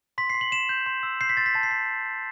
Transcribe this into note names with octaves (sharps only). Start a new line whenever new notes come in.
C6 B6
C6 C7
F#7
C6 E7
G6
C6
E6
G6 C7
B6
C6 A6
B6
A5 A6
C7
A5 B6